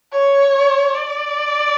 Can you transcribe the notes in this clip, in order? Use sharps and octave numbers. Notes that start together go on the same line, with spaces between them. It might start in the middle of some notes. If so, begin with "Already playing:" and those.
C#5
D5